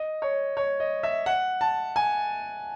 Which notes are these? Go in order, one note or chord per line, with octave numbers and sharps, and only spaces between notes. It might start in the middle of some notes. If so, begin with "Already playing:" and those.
Already playing: D#5
C#5
C#5
D#5
E5
F#5
A5
G#5